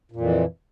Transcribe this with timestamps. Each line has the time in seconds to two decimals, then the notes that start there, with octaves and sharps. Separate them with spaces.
0.11 A#2
0.16 F2
0.21 E3